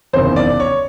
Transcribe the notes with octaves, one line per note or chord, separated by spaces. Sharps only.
F#1 E2 C3 D#3 C5
D5
C#5